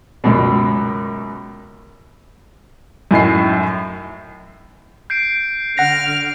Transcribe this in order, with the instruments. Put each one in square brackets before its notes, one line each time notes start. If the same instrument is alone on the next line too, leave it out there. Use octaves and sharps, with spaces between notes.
[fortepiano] C#2 F#2 B2
[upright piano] F#2 A2 D#4 C7
[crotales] G6 C7 D7
[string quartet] D3 F6 [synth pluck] F#5 A#6